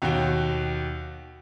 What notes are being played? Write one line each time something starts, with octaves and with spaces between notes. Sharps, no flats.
D#2 B2 F#4 G5